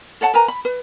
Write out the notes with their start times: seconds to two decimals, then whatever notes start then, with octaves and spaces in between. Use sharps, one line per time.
0.21 A4 C#5 F#5 A5
0.34 A#4 B4 G#5 A#5
0.48 B5
0.65 B4